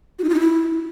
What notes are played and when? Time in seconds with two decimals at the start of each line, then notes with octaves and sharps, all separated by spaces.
0.19 F#4
0.24 D#4
0.29 F4
0.34 D#4
0.39 E4